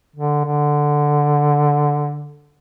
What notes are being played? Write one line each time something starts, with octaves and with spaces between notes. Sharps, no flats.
D3
D3